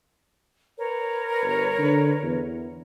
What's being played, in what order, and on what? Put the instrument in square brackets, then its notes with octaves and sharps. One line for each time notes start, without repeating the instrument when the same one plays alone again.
[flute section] A#4 B4 C#5
[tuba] G1
D3
E2